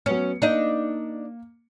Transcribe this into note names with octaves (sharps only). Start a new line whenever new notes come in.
F#3 B3 C#4 C#7
A#3 D4 D#4 D#5